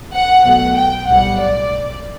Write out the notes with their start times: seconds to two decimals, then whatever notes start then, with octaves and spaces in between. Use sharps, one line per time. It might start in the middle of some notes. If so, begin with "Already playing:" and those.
0.12 F#5
0.44 B1 B2 A3 F#5
0.75 G5
1.07 B1 A2 G3 F#5
1.38 D5